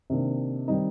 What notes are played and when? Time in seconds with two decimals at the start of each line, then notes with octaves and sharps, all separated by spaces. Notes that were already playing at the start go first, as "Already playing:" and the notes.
0.10 C3 D#3 A#3 D4
0.68 D#3 G3 C4 D#4